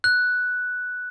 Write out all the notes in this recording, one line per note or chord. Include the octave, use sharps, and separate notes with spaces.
F#6